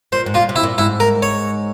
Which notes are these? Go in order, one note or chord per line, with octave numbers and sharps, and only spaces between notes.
A#2 C5
G#2
A#2 F4
C3
E4
A#2
G#2 E4
A#4
C#5